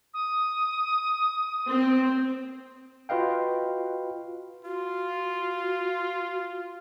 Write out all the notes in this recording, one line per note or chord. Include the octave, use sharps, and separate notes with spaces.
D#6
C4
F4 F#4 B4 D#5 F5 G5
F4 F#4